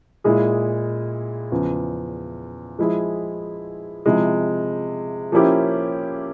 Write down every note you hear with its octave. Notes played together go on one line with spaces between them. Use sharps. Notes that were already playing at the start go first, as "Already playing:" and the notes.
A#2 G#3 E4 G#4
E2 C#3 F3
F3 G#3 E4 G#4
C3 F3 G#3 E4
F3 A#3 C#4 E4 G4